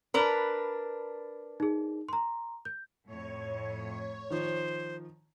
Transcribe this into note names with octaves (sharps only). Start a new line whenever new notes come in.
D4 A#4 B4 A#5 B5
D#4 G#4
A#5 C6
G6
F2 A2 C#5
D#3 F3 C5